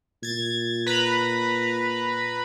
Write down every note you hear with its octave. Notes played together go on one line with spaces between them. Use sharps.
A#2 G#6 A6
B4 A#5 B5